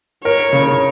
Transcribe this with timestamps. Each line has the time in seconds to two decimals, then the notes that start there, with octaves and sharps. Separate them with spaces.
0.24 A#4 C#5
0.53 C#3